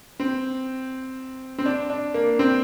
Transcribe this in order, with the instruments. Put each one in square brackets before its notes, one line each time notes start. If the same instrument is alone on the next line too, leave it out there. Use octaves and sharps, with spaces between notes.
[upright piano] C4
C4
D4
D4
A#3
C4